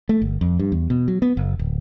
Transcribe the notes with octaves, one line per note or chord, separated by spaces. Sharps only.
A3
G1
F2
G2
E2
B2
F#3
B3
F#1
D1